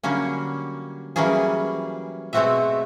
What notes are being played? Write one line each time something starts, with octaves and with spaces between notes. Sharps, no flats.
D3 F#3 G3 A#3 C#4
E3 F#3 G3 A#3 C#4 G#4
B2 G#3 A3 C4 F#4 E5